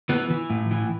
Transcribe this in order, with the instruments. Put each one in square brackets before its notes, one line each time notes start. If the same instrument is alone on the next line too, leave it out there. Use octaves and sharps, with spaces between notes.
[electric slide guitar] E3 B3
E3
A2
E3